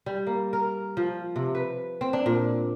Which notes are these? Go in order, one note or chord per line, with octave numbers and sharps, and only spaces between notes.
G3
A#3
A#4
F3
C3
B4
C4
D4
A#2